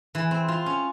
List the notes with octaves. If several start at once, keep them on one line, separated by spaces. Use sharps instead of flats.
E3
C4
F4
C#4